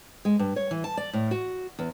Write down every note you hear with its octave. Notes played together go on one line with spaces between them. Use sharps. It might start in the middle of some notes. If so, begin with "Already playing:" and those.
G#3
G2
C#5
E3
A5
D5
A2
F#4
E2